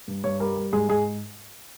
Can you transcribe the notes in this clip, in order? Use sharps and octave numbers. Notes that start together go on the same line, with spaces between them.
G2
G2 C#5
G3 A#4
G3
G#2 G#4
G#2 G#4